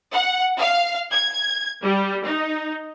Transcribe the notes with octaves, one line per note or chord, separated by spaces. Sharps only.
F#5
F5
G#6
G3
D#4